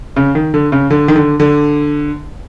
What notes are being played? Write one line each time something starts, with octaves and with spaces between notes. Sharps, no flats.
C#3
D#3
D3
C#3
D3
D#3
D3
D3